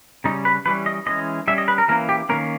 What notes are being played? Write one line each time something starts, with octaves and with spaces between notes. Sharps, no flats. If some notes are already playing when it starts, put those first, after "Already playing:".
C#3 G3 C#4 D#4
B4
E3 G3 C#4 B4
D#5
E3 G#3 C#4 D#5
G3 C#4 E5
D#5
B4
A#4
E3 A#3 C#4 A#4
G4
D#3 A#3 C#4 A#4